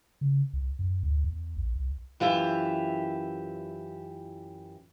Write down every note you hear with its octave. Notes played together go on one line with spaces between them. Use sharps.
C#3
C2
F#2
D2
E2
A#1
C2
F#2 E3 F4 G4 E5